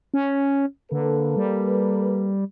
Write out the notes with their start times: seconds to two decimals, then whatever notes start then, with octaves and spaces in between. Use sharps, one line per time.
0.14 C#4
0.92 D3 A#3 A4 B4
1.37 G3